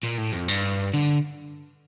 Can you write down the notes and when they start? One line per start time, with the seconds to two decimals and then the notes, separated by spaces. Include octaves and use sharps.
0.03 A#2
0.17 A2
0.32 F2
0.48 G2
0.94 D3